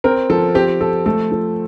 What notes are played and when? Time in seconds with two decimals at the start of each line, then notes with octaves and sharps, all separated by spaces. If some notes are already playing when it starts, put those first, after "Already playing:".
0.04 C4 A#4
0.30 F3 A4
0.55 C4 G4
0.81 F3 A4
1.06 A3 A4
1.32 F3